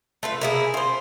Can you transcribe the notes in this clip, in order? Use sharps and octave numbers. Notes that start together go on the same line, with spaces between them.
A3 F4 B4
A#3 E4 G#4
F4 C5